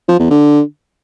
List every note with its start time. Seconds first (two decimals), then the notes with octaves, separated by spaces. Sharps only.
0.08 F3
0.19 E2
0.30 D3